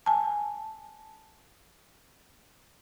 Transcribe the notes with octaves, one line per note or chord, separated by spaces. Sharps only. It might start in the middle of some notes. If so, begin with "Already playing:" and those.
G#5 A5